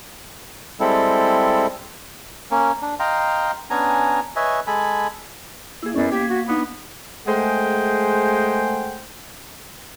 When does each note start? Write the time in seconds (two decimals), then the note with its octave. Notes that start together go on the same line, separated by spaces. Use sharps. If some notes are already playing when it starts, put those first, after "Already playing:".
0.80 G3 G#3 C4 E4 A4
2.51 A#3 C#4
2.82 D4
3.00 D#5 F5 G5 A#5 C6
3.70 B3 C#4 D4 G#5 A#5
4.36 B4 C#5 D#5 E5 G#5
4.67 G#3 A4 G#5 B5
5.83 A#3 E4 G#4
5.96 F#2 B3 C#4 D5
6.11 A#3 G4 G#6 B6
6.30 F#4
6.48 B3 D4 D#4
7.27 G#3 A3 G#4 C5 F#5 G5